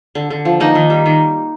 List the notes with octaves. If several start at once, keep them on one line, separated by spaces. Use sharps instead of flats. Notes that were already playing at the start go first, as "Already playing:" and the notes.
D3
D3
F3
A#3 D#4
D#3
G3
D#3